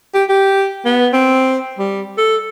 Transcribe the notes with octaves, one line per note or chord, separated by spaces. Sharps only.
G4
G4
B3
C4
G3
A4